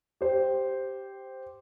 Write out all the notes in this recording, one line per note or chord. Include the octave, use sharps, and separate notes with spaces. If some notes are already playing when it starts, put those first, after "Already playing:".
G4 C5